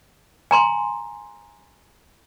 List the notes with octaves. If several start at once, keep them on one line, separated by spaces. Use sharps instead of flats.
G#5 A#5 C6